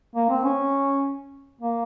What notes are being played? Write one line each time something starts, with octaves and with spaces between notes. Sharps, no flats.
A#3
C4
C#4
A#3